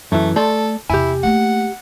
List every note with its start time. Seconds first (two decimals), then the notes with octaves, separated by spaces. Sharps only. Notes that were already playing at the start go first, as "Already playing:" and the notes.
0.12 F#2 E3 A3
0.36 A3 A4 D5 C6
0.90 E2 C3 E4 G4 G#5
1.23 A3 A#3 F#5